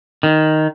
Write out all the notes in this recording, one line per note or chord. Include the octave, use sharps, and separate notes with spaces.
D#3